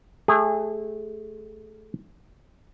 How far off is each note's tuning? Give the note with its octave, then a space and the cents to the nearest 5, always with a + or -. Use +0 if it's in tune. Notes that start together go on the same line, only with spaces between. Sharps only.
A3 -20 G#4 -35